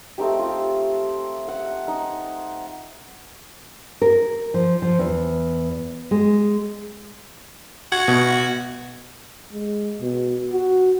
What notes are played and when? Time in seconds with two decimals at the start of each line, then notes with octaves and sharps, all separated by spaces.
0.18 A3 C4 D#4 G4
0.39 F4
1.48 F#5
1.88 D#4
4.02 A#4
4.54 F3
4.82 F3
4.99 E2
6.11 G#3
7.92 F#4 G#6
8.08 B2
9.53 G#3
10.01 B2
10.52 F#4